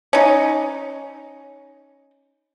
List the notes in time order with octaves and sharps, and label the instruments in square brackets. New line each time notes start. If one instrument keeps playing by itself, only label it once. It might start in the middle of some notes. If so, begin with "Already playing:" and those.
[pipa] C#4 D#4